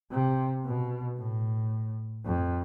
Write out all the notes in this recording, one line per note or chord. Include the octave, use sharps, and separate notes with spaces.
C3
B2
A2
F2